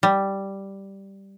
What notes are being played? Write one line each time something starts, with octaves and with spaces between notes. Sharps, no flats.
G3